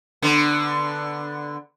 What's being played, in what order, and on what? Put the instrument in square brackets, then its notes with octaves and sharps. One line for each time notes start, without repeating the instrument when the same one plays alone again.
[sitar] D3 B3